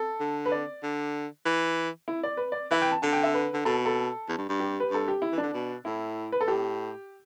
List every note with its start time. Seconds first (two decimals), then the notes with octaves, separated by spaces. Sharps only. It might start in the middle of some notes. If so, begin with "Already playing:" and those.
Already playing: A4
0.20 D3
0.46 B4
0.52 D5
0.83 D3
1.46 E3
2.08 E4
2.23 D5
2.37 B4
2.52 D5
2.71 E3 E5
2.82 G5
2.92 A5
3.02 D3 A5
3.13 G5
3.24 E5
3.34 B4
3.54 D3
3.65 B2 A4
3.86 A4
4.29 E2
4.38 G2
4.49 G2
4.60 G4
4.80 B4
4.90 G2 A4
5.08 G4
5.22 E4
5.32 E3
5.38 D4
5.43 D3
5.54 B2
5.85 A2 E4
6.32 B4
6.41 A4
6.47 A2 G4